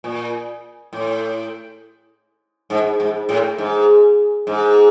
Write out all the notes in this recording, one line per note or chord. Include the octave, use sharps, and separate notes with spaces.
A#2
A2
G#2
G#2
A2
G#2
G#2